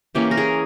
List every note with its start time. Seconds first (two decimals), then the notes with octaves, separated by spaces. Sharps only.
0.15 E3 A#3 C#4 G4
0.31 A#4
0.37 G#4